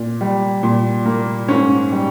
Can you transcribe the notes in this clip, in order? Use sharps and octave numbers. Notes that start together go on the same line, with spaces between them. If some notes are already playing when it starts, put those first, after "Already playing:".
Already playing: A#2
G3
A#2
A#3
G#2 C#4
G3